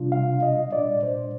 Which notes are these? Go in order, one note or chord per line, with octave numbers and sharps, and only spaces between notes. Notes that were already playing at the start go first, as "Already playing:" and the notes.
Already playing: C3 G3 D4 F4
F5
D#5
A#2 G3 D4 D5
C5